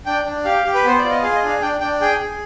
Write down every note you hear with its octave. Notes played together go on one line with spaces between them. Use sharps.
D4 G5
D4
G4 F5
G4
B4
B3 C5
F4 D5
D#5
G#4 F5
D#5
D4
F5
D4 G5
D4 G5
G#4 G5
G#4